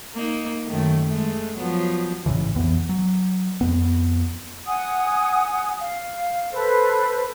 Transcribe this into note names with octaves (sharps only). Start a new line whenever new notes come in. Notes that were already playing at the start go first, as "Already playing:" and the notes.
A#3 D#4
F#2 D#3 A3
G#3 A3
F3 F#3 B3
A1 G#2 C#3 E3
B1 F2 E3 B3
F#3
F2 B3
F#5 G#5 D#6
F5
A4 B4 C5